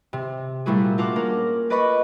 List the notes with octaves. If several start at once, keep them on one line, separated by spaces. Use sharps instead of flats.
C3
A#2 G3 A3 E4 F#4 G#4
D4 F4 A#4 F#5 A5 D6
A#3 C#4 A#4
B4 D5 D#5 B5 C#6